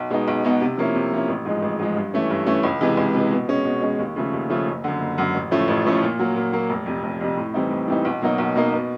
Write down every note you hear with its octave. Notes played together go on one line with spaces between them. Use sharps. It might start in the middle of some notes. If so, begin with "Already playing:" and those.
Already playing: B1
B2 G#3 B3 D#4
B1
B2 G#3 B3 D#4
C3
F3 A#3 C#4 E4
C3
F3 A#3 C#4 E4
A1
G#2 F3 G#3
A1
G#2 F3 G#3
G2
E3 A3 C#4
G2
E3 A3 C#4
C#2
C3 E3 G#3
C#2
C3 E3 G#3
B2
G#3 C#4
B2
G#3 C#4
D#2
C#3 F3 A3 C#4
D#2
C#3 F3 A3 C#4
F#1
F#2 D3
F#1
F#2 D3
A1
A2 F3 A3 C#4
A1
A2 F3 A3 C#4
A#2
F#3 A#3
A#2
F#3 A#3
F1
F2 C3
F1
F2 C3
A2
E3 G3 C4 D#4
A2
E3 G3 C4 D#4
B1
B2 F#3 A#3 D#4
B1
B2 F#3 A#3 D#4
B2